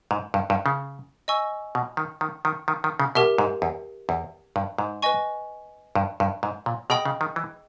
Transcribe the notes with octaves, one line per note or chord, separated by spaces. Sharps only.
G#2
G2
G2
C#3
D#5 G#5 C#6 E6
B2
D#3
D#3
D#3
D#3
D#3
C#3
B2 G4 A#4 E5
G#2
E2
E2
G2
G#2
B4 D#5 G#5 C#6
G2
G2
G#2
A#2
B2 G#4 D#5 G5 B5 D#6
C#3
D#3
E3